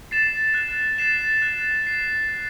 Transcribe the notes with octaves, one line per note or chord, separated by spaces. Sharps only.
A6 C7 E7
F#6
A6 C7 E7
F#6
A6 C7 E7
F#6